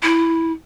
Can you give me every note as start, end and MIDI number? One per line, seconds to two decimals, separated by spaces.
0.03 0.52 64